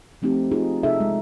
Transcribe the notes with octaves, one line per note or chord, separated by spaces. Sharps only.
F3 A3 C4 D#4 G4
D#4 F4 G#4
C3 D#4 G#4 A4 E5
G#3